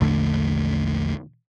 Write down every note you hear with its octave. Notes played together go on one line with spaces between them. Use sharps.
A#1 E2 D3 A3